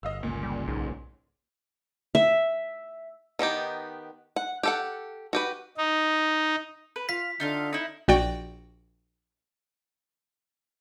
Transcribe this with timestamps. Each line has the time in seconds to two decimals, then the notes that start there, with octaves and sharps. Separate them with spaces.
0.03 G1 D#5 F5 E6
0.23 C#2 A#2
0.43 G3
0.68 B1 G#2
2.15 E5
3.39 D#3 B3 D#4 G4
4.36 F#5
4.63 G4 A4 F#5
5.33 F#4 G4 B4
5.77 D#4
6.96 B4
7.09 F4 F5 B6
7.40 D3 D#4 F4 F5
7.73 D#4 E4
8.08 A#1 F#4 D5 G5